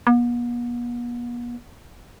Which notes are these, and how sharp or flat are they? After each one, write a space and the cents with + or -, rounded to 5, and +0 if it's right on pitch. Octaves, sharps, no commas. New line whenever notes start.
B3 -45